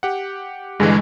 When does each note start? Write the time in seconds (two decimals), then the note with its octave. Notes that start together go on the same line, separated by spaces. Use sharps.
0.03 G4 F#5
0.80 G2 D3 E3 G#3